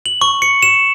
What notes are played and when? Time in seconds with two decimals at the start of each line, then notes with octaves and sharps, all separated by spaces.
0.06 F#7
0.21 C#6
0.42 C#7
0.63 E7